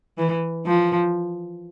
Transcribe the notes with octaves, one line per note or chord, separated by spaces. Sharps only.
E3
F3